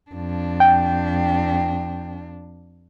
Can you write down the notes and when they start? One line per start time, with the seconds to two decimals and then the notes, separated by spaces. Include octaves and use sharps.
0.11 F2 D4
0.60 G5